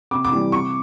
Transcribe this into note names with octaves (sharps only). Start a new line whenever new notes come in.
C3 D6
D6
E3 G3
C3 C#6